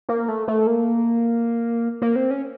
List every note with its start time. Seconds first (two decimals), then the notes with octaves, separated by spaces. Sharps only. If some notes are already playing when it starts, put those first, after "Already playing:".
0.09 A#3
0.28 A3
0.48 A3
0.67 A#3
2.02 A#3
2.16 C4
2.31 C#4